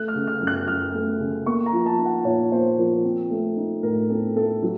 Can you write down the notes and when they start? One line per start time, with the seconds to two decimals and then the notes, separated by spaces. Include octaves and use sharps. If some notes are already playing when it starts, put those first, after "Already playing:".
Already playing: A3 F#6
0.08 F6
0.15 C#3
0.27 F6
0.41 F#2
0.47 F#6
0.67 F#2 F6
0.94 A3
1.20 C#3
1.46 A#3 C#6
1.66 A#5
1.73 F3
1.86 A5
1.98 D#4
2.05 F#5
2.25 A#2 C#5
2.51 A#3 C5
2.78 F3 A#4
3.04 C4
3.30 A3
3.57 D#4
3.83 A2 A#4
4.10 C4 A4
4.36 A3 A4
4.63 F#3